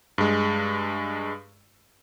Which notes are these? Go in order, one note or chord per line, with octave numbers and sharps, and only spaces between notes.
G2 G#3